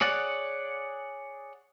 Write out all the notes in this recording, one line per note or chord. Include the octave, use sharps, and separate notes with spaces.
G#4 C#5 D5 F#5